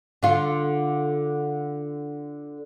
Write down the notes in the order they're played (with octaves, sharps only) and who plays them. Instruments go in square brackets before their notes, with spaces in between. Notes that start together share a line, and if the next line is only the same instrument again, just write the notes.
[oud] D3 F4